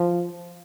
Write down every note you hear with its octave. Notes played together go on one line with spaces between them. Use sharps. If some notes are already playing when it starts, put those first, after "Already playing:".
Already playing: F3